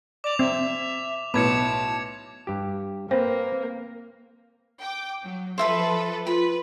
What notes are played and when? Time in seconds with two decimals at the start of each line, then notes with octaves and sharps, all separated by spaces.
0.24 D5 D6 F7
0.39 C4 E5
1.34 B1 A2 B3 B4 A5 D6 G#6 C#7
2.47 G2 G4
3.11 A#3 C4 B4 C5
4.81 G5 D6
5.23 F#3
5.58 F3 A4 B4 C5 E5 B5
6.27 F4 B4 B5